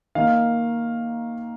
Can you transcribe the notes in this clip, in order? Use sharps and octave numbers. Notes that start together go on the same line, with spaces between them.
D#3 A#3 F5